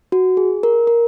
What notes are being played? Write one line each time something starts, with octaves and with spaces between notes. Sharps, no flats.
F#4
G#4
A#4
A#4